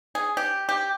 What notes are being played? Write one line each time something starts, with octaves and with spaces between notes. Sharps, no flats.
G#4
G4
G4